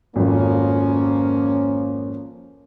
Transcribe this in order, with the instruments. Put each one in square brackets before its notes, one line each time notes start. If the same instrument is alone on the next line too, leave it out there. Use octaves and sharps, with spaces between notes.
[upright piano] G#1 F2 [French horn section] F3 A#3 C#4